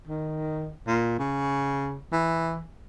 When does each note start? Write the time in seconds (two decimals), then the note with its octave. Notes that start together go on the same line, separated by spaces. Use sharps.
0.08 D#3
0.87 A#2
1.19 C#3
2.12 E3